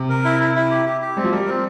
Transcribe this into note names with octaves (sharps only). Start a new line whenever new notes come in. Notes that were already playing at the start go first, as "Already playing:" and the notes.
Already playing: C3
A#4
E4
E4
E4
G4
G4
G4
G3 C4
F3
G3 A#4
C4